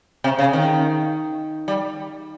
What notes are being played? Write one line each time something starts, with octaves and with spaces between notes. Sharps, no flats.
C3
C#3
D#3
G3